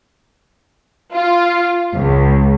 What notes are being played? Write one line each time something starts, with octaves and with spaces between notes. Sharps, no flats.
F4
C#2